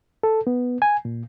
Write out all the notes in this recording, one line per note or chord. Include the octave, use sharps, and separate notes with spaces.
A4
B3
G#5
A#2